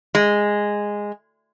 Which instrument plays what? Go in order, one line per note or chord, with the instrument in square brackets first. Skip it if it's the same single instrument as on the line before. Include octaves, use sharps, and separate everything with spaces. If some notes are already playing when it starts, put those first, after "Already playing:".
[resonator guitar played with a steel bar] G#3